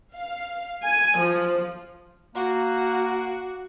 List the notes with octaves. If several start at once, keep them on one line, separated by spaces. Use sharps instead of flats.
F5
G#5
F3
A#3 F#4